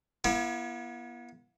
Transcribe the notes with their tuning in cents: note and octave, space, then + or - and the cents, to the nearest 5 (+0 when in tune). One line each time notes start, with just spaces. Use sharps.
B3 -40 E4 +35